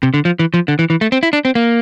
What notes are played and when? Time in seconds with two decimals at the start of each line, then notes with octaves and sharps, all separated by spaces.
0.03 C3
0.14 D3
0.25 F3
0.39 E3
0.54 F3
0.68 D3
0.79 E3
0.90 E3
1.01 A3
1.12 C4
1.23 E4
1.33 D4
1.45 C4
1.55 A#3